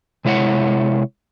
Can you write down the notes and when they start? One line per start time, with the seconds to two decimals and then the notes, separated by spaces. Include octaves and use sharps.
0.25 C3 G#3 E4 C#5 F#5